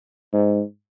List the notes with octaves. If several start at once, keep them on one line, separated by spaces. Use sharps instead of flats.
G#2